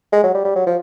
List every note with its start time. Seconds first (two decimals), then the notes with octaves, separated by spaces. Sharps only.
0.12 G#3
0.23 F#3
0.34 G3
0.45 G3
0.56 F#3
0.66 F3